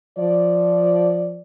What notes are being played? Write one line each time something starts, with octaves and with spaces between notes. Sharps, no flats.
F3 D5